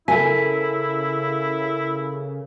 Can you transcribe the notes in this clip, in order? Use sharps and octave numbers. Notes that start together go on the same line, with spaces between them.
C#3 E4 A4 A#4 G#5 B6